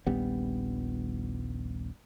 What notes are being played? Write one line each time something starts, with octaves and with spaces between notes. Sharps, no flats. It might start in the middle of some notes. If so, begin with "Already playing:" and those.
D#1 A#1 G3 B3